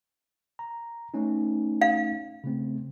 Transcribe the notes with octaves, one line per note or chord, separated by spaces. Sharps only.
A#5
A3 C#4 D#4
F5
C#3 A3 C4